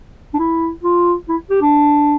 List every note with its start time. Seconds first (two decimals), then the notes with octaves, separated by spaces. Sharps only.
0.34 D4
0.38 E4
0.83 F4
1.28 E4
1.50 G4
1.62 D4